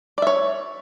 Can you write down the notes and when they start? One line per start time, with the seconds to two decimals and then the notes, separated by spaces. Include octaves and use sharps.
0.18 D5
0.22 E5
0.27 C#5